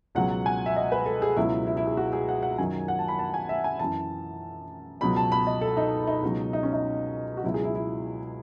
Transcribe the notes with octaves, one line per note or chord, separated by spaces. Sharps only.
C#2 B2 F#3 F#5
G#5
E5
D#5
B4
A4
G#4
C#2 B2 F#3 E4
E4
E4
G#4
F#4
G#4
F#5
F#5
F#2 D#3 F#3 G#5
F#5
A5
B5
A5
G#5
E5
G#5
F#2 E3 A5
C#2 B2 F#3 B5
A5
B5
D#5
A4
D#4
D#4
C#2 B2 F#3
D#4
C#4
D#4
F#4
C#2 B2 F#3 E4
G#4
E4
E4